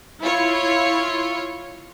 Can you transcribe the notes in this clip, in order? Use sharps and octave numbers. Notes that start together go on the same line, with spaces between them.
E4 F4 C#5